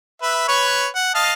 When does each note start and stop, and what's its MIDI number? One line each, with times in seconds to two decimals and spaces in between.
0.22 0.46 71
0.22 0.46 76
0.48 0.87 71
0.48 0.87 73
0.48 0.87 85
0.95 1.10 78
1.15 1.33 75
1.15 1.33 77
1.15 1.33 81